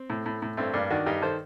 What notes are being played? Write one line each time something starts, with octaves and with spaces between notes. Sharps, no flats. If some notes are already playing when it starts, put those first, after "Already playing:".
Already playing: C4
A2
A2
A2
G2 A3 C4
G2 A#3 D4
D#3 D4 F#4
G2 D#4 G4
D#3 A4 C5